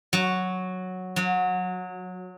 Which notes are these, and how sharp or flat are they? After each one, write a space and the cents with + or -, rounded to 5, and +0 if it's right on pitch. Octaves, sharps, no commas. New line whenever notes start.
F#3 -5
F#3 -25